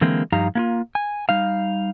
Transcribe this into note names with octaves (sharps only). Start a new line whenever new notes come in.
D3 E3 G#3 A#3 C4
G2 F3 D#4 G4 F5 A#5
A#3 E4 F4
G#5
G3 D#4 F5